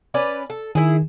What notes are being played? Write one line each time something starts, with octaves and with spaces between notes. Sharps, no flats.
C#4 B4 D5
A4
D#3 E4 G#4